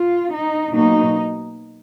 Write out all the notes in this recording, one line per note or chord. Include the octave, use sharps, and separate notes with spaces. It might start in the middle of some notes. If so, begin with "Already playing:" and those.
Already playing: F4
D#4
B2 F#3 A#3 D#4